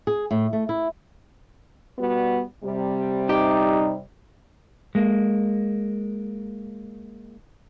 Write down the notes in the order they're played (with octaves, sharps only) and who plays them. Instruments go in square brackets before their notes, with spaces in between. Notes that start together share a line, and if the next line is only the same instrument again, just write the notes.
[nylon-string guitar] G#4
A2
A3
E4
[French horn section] G3 B3 F#4
C3 G3
[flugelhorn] D#4 [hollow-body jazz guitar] G4
[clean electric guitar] G#3 A#3